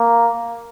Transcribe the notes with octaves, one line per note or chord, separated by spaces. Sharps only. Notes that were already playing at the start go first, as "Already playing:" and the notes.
Already playing: A#3